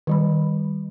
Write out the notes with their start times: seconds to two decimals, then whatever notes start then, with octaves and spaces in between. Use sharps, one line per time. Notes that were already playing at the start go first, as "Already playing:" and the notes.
0.07 D#3 G3 B5